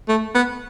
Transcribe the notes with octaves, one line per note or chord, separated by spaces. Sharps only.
A3
B3